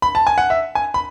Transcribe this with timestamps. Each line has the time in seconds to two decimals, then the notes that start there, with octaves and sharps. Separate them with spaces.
0.02 B5
0.15 A5
0.27 G#5
0.38 F#5
0.50 E5
0.75 G#5
0.94 B5